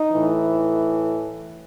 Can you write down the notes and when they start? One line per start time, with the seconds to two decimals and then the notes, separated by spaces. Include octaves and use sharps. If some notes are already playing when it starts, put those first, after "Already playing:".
Already playing: D#4
0.10 A2 E3